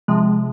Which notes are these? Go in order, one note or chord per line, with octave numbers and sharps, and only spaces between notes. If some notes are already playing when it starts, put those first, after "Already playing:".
C3 F3 G#3